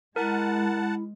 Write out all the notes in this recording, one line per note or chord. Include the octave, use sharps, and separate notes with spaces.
G#3 E4 A#4 F#5 A5